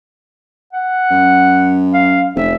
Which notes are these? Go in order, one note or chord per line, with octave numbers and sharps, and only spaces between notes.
F#5
F#2
F5
F1 E5